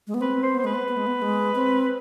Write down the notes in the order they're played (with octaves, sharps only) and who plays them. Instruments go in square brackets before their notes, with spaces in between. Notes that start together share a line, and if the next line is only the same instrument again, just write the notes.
[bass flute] G#3
B3
[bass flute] C4 [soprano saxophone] B4
[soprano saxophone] C5
[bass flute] B3
[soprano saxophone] C5
[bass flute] G#3 [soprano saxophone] B4
[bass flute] B3
B3
G#3
B3
G#3
C4